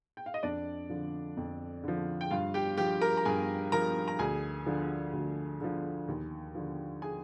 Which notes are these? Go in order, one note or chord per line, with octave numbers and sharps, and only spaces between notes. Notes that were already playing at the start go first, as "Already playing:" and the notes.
G5
F5
D#5
F2 D4 D5
D3 F3
F2
D3 F3
G5
G2 F4 F5
G4 G5
F3 G4 G5
A#4 A#5
A#5
G2 G#4 G#5
F3 A#4 A#5
A#5
D2 G#4 G#5
D3 F3
D2
D3 F3
D#2
D3 F3
G#4 G#5